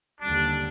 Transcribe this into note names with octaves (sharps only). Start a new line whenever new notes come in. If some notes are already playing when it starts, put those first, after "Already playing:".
D#2 D3 G3 D4